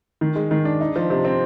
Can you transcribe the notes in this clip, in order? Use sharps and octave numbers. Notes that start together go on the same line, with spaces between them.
D#3
G#3
D#3
D4
D#4
F3
C3
C4